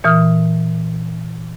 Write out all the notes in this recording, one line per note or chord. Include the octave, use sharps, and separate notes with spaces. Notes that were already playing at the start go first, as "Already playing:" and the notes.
A#2 E3 D#6 F6